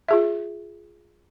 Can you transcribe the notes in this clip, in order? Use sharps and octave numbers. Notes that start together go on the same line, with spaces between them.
F4 G#4 E5